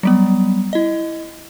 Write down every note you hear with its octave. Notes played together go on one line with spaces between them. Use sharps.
F#3 G3 B3
E4 D#5